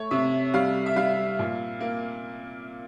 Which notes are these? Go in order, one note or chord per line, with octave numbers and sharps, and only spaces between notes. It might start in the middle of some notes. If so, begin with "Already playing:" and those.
Already playing: A3 C#5
C3 E5
G3 F5
E5
G3 F5
A#2
A#3